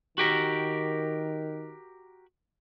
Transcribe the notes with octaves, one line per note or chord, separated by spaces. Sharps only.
D#3 F#4 G4 A#4